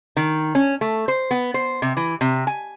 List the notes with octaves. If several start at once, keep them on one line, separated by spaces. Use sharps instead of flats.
D#3
C#4
A3
C5
B3
C5
C3
E3
C3
G#5